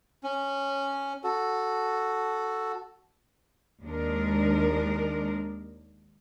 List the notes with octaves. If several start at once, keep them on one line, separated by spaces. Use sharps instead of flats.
C#4
F#4 A4
D#2 G#3 D4 A#4